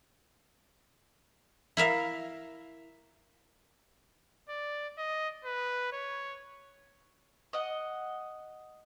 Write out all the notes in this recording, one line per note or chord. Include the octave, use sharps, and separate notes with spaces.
E4 A#4 E5 F5
D5
D#5
B4
C#5
D#5 F#5